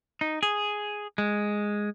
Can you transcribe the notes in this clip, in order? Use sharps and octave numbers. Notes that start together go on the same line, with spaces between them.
D#4
G#4
G#3